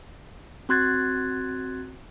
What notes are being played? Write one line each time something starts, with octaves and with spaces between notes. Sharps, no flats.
C4 F#4 C6 F#6 G#6 A6